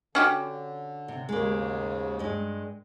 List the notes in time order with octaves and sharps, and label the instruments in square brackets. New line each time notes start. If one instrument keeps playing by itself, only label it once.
[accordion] D3 [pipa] C#4 F#4 G4
[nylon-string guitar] C3
[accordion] D#2 G#2 C#3 [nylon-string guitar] G#3 A#3
[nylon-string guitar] G2 G#3